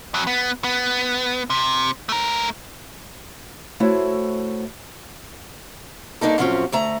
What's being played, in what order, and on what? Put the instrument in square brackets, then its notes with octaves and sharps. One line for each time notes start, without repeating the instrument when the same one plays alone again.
[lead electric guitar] F2 F#3
B3
B3
C3
A3 A#4
[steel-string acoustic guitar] A3 E4 F#4 C5 C#5
G2 A#3 D4 D#4 A4
A2 F3 F#3 C4 C#4 F4
D2 A3 A#5